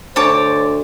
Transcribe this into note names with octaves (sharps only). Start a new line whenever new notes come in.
D2 C5 C#5 A5 D6